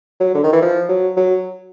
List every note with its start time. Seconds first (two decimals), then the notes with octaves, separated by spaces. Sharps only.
0.20 F#3
0.35 D3
0.44 D#3
0.53 E3
0.62 F3
0.89 F#3
1.17 F#3